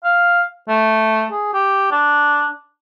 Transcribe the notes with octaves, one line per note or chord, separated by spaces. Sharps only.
F5
A3
G#4
G4
D4